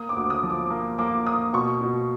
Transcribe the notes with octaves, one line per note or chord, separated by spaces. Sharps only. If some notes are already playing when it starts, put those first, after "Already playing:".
Already playing: A#3 D#6
D6
D2
D#6
F3
D6
A#3
A#3 D6
A#3 D#6
B2 C#6
B2